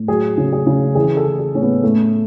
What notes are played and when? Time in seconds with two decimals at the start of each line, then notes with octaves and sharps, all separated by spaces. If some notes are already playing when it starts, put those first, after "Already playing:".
Already playing: A2
0.08 F#3 G#4
0.37 C#3
0.53 G#4
0.66 C#3
0.95 E3 G#4
1.17 A4
1.25 E3
1.39 G#4
1.54 A2 C#4
1.62 B3
1.83 A2 A3